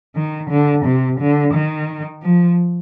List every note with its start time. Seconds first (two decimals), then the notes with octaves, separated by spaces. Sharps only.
0.16 D#3
0.50 D3
0.85 C3
1.20 D3
1.54 D#3
2.23 F3